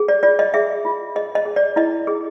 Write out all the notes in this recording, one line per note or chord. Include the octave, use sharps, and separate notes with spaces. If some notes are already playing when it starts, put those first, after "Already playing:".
Already playing: G#4
D5
F4 D5
D#5
G#4 E5
F4
G#4 D#5
D#5
G#4
D5
E4 D#5
G#4